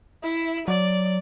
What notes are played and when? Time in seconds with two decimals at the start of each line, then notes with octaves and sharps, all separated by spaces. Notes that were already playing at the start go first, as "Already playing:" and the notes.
0.23 E4
0.68 F#3 D5